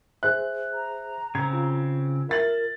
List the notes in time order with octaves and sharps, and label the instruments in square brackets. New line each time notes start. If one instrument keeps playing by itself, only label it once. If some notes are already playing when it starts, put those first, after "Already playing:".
[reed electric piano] G#4 C5 E5 [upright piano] F#6
[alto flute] A#5
[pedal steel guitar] C#3 C4 [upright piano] G#6
[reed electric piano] F4
[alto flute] A#4 [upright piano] E5 A6 F#7